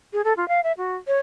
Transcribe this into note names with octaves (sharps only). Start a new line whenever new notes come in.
G#4
A4
F4
F5
E5
F#4
C#5